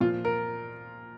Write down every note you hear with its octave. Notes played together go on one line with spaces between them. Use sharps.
A#2 F3 F4
A#4